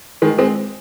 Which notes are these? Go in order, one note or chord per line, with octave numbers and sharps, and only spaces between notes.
D#3 G#3
G#3 C4